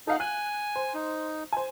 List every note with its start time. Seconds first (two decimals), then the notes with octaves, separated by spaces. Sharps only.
0.07 D#4 A4 F5 F#5
0.20 G#5 F#6
0.76 C5
0.94 D#4
1.52 C5 G#5